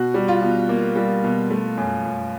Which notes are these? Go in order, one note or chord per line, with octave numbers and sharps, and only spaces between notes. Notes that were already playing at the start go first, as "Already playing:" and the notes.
Already playing: B2 F#4
G3
F4
B2
A#3
G3
B2
A3
F#2
F#2